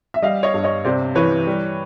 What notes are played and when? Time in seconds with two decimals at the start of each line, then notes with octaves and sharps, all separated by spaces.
0.14 E5
0.22 G3 D#5 F5
0.43 C#5 D#5
0.54 G2
0.64 C#5 D#5
0.85 C3 C5 D5
1.15 E3 B4 C#5
1.47 G3